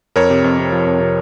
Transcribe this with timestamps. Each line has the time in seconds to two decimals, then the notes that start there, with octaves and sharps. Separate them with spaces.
0.16 F2 A#4 C#5
0.30 C3
0.44 F2
0.59 C3
0.72 F3
0.86 F2
1.01 C3